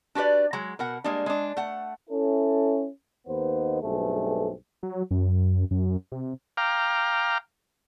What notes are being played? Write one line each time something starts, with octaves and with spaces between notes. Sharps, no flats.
D4 F#4 G4 B4 D5
F#3 G#3 A#5
B2 A#4 F#5
G3 G#3 A#3 D4
G#3 D4
A3 F#5
C#4 E4 A4
D#2 A#3 B3 D#4 B4 C5
B1 G2 A3 C4 G#4 A4
F#3
F#2
F#2
C3
F5 G5 A#5 D6 F6